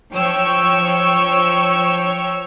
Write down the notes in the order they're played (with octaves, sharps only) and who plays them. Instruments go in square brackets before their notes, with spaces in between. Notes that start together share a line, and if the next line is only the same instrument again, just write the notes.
[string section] F3 C#5 G5 C#6 E6